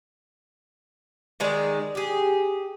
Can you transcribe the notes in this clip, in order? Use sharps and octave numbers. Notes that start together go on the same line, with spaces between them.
D#3 G#3 D5
G4 G#4